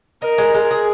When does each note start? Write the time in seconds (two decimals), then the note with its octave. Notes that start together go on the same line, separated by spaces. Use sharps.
0.22 D#4 A#4
0.38 G#3
0.54 G#3
0.71 G#4